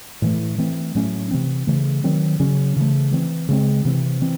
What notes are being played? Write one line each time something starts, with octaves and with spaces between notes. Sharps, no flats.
A2 E3 A3
E3 A3 C4
A2 F#3 A3 C#4
C3 E3 C4
C#3 E3 A3
D#3 F#3 C4
C#3 F#3 C#4
C#3 E3 A3
E3 C4
C#3 G#3 C4
C3 E3 C4
E3 C4